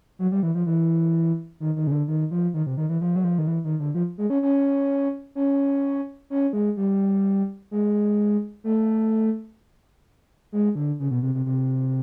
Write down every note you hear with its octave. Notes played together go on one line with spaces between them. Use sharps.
F#3
G3
E3
F3
E3
D#3
D#3
C#3
D3
D#3
F3
D#3
C3
D#3
E3
F3
F#3
F3
D#3
E3
D#3
D3
F3
G#3
C#4
C#4
C#4
C#4
G#3
G3
G#3
A3
G#3
D3
C#3
B2
C3
C3
C3